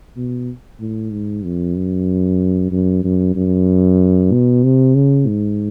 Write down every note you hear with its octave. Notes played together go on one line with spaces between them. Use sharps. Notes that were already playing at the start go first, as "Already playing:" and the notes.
B2
A2
G#2
F2
F#2
F#2
F#2
F#2
B2
C3
C#3
G#2